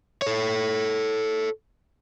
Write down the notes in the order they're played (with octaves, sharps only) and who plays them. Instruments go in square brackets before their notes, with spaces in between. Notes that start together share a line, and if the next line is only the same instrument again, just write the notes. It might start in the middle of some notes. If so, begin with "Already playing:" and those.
[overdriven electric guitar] A4 C#5